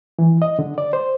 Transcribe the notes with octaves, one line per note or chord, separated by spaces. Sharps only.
E3
D#5
D3
D5
C5